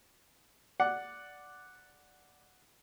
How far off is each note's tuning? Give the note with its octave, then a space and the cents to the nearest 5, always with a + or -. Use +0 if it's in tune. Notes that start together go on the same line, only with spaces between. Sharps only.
D5 +0 F#5 +0